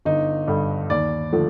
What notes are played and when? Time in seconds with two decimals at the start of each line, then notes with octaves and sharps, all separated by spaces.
0.05 G1 D#4
0.48 G2 D3
0.90 D#2 D5
1.33 D3 F3 A3